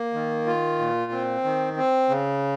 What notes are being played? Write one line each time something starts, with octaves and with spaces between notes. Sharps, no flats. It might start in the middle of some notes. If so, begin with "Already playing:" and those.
Already playing: A#3
D#3
F4
A#2
C4
D#3
C4
C#3